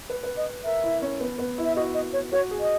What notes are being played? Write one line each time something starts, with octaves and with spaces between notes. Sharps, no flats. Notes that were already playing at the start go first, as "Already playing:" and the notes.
B4
B4
D#5
A#4 E5
E4
C#4
B3
B3
E4
E5
F#4 D#5
D#5
C#5
F#4 C#5
G#4
D#5